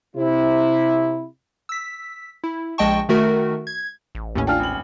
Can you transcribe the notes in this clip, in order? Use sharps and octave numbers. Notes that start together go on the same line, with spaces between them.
C3 E4
E6 B6
E4
A#1 G#3 D#5 G5 A5 C#6
D#3 A3 F#4 A#4
G#6
A1
D#2 A2 C#4
D4 F4 G5 G#5 F6
G#1 F#7